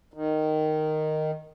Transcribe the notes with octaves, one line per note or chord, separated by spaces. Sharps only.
D#3